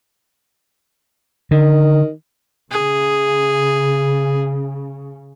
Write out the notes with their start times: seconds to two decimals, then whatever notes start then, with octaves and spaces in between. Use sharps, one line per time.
1.51 D3 D#3
2.71 C#3 G#4